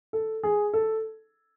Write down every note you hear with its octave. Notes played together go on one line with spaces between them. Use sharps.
A4
G#4
A4